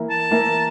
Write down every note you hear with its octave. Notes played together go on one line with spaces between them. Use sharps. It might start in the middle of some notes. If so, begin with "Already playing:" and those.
Already playing: E3 A#3 E4 A#4
A5
E3 A#3 E4 A#4